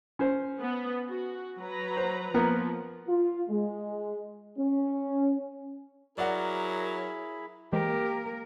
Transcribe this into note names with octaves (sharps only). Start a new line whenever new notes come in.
C#4 C5
B3
F#4
F#3 B4 A#5
C5
F3 A#3 B3 A#5
F4
G#3
C#4
F#3 E4 G#4 A#4 D5 F#5 B5
E3 G#3 A#3 G4 A#4 C5